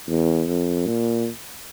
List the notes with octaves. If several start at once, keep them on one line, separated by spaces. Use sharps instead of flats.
E2
F2
A#2